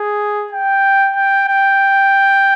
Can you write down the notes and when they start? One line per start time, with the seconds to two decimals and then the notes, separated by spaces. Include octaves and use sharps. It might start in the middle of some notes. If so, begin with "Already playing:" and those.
Already playing: G#4
0.53 G5
1.16 G5
1.48 G5